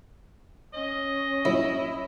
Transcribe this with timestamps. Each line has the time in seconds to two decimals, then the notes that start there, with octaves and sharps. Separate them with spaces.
0.74 C#4 D#5
1.45 G2 A#2 F#3 E4